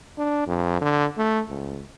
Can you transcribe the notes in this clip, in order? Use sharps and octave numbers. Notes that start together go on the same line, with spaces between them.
D4
F2
D3
A3
C#2